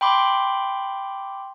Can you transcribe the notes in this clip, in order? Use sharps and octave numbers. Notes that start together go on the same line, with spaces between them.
G5 B5 C6 D6